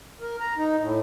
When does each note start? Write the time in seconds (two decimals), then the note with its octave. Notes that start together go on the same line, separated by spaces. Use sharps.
0.21 A#4
0.40 A#5
0.57 D#4
0.80 A2